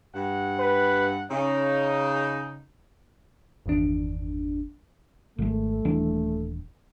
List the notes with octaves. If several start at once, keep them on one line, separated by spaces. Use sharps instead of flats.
G2 F#5
B4
C#3 D#4 C#5
G1 E2 D#3 D4
G#1 G#3 A3
D#1 E3 D4